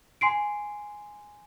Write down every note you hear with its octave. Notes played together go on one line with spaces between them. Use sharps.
G#5 C6 C7 D7